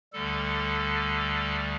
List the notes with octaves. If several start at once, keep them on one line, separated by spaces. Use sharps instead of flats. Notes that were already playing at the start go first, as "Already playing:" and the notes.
D2 D3 G3 A4